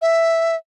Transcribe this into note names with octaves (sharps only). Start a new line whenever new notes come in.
E5